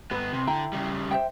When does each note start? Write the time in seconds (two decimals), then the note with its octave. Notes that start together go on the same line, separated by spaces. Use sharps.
0.11 G2 B3 B4
0.33 C2 C3
0.47 D3 E4 G5 A#5
0.73 C#3 G3
1.11 C5 E5 G5